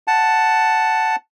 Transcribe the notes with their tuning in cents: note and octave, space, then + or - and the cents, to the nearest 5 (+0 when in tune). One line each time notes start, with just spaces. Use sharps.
F#5 +0 A5 +0